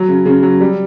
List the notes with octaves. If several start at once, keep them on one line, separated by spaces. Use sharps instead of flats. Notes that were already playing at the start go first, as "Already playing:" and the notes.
Already playing: F#3
C#3
C#3
F#3
G3